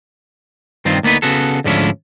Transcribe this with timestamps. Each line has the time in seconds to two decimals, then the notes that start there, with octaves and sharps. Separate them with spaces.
0.85 G2 D#3 C4 F4
1.03 D2 A#3 B3 D#4 B4
1.22 C#3 B3 F#4 A4
1.64 D2 G#2 D3 F3 C#4 E4